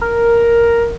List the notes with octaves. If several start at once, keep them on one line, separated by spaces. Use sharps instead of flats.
A#4